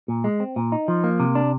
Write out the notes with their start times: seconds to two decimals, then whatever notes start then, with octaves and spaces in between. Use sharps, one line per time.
0.08 A#2
0.24 G#3
0.40 C4
0.56 A#2
0.72 D#4
0.88 F3
1.04 A#3
1.20 C3
1.35 D4